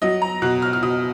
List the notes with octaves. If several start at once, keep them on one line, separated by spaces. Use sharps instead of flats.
F#3 D#5
A#5
B2 F#6
F6
F6
B2 D#6